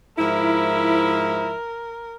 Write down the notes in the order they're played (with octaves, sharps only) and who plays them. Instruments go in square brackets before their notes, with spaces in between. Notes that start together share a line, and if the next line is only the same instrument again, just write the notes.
[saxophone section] G#2 F3 E4 [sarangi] A#4